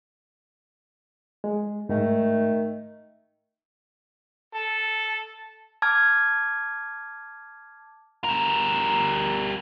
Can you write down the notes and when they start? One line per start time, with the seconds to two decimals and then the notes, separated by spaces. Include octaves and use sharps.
1.44 G#3
1.89 G#2 D#3 A3
4.55 A4
5.82 A5 D6 F6 G#6
8.24 G3 A#4